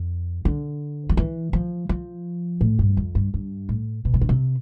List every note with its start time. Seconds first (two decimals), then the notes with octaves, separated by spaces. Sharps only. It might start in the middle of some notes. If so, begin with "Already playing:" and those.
Already playing: F2
0.45 D3
1.09 F3
1.17 E3
1.53 F3
1.89 F3
2.61 A2
2.79 G2
2.97 F2
3.15 G2
3.34 G2
3.69 A2
4.05 B2
4.14 E3
4.21 D3
4.29 C3